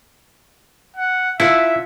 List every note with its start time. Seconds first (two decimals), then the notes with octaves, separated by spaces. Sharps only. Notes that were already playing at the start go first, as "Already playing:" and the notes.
0.97 F#5
1.40 E4 F4 E5 F#5 A5